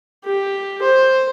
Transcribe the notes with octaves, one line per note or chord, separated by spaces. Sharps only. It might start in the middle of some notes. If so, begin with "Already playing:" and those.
G4
C5